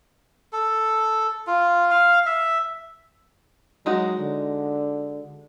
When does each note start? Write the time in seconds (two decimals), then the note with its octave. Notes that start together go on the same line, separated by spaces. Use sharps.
0.53 A4
1.47 F4
1.91 F5
2.26 E5
3.86 F#3 G#3 D#4 F#4
4.19 D3